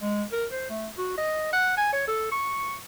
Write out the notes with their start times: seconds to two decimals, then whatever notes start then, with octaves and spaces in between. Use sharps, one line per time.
0.02 G#3
0.33 A#4
0.52 C5
0.70 A3
0.98 F#4
1.18 D#5
1.53 F#5
1.77 G#5
1.93 C#5
2.08 A4
2.32 C#6